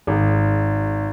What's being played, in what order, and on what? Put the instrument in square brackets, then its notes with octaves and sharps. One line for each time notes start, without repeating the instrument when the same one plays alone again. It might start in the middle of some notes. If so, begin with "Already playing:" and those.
[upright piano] G#1